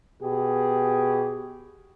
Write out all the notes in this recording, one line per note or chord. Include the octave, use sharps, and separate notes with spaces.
B2 G4 G#4